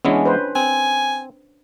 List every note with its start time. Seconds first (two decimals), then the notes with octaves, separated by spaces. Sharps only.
0.05 E3 G#3 B3 C#4 D4
0.26 B4 C5
0.55 C4 G#5